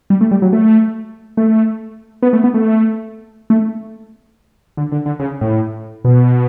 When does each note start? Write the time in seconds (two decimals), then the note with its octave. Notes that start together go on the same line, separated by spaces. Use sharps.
0.10 G3
0.21 A3
0.31 G3
0.42 F#3
0.53 A3
1.37 A3
2.22 B3
2.33 A3
2.44 B3
2.54 A3
3.50 A3
4.77 D3
4.92 D3
5.06 D3
5.19 C#3
5.41 A2
6.05 B2